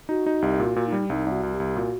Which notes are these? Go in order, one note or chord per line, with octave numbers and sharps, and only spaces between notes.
D#4 F#4
D#4
C2 G4
A#2 F#4
A#2
D#4
G3
C2 D#4
C2
F#4
C2
G4
C2
A#2 F#4